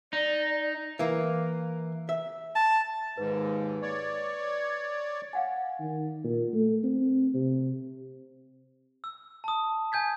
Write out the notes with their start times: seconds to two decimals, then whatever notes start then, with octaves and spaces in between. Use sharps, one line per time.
0.13 D#4 D5
0.99 E3 A#3
2.09 E5
2.55 A5
3.17 D#2 G#2 B4
3.82 C#5 D5
5.33 F5 F#5 G#5
5.80 D#3
6.24 A#2
6.54 A3
6.84 C4
7.34 C3
9.04 E6
9.44 A5 D#6
9.92 G#5 G6 G#6 B6